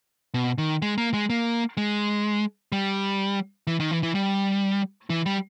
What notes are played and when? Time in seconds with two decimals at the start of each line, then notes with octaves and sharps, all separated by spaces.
0.34 B2
0.58 D#3
0.82 G#3
0.98 A#3
1.14 G#3
1.30 A#3
1.77 G#3
2.72 G3
3.67 E3
3.80 D#3
3.91 E3
4.03 E3
4.15 G3
5.10 E3
5.26 G3